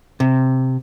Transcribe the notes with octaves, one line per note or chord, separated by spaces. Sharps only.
C3